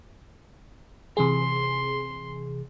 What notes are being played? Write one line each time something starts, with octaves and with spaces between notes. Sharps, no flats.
C3 E3 G#4 C6